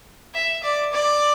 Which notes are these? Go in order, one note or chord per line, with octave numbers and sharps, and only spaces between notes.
E5
D5
D5